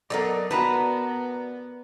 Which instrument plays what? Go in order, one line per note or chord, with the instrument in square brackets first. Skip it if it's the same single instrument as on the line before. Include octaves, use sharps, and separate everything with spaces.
[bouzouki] F#3 D#4 A4 [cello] B3 [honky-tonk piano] A#4 D5
[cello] B3 [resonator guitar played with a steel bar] F#4 B4 [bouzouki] A5 A#5